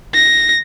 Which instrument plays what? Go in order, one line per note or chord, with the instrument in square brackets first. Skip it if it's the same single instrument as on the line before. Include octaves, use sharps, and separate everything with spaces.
[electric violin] A#6